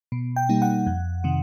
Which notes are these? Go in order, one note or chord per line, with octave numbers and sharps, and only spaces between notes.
B2
G5
G3 A#3 D#4
F#5
F2
C3 D#3